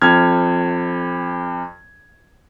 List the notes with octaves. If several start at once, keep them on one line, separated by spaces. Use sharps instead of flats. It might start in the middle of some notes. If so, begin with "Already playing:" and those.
F2 F6 G#6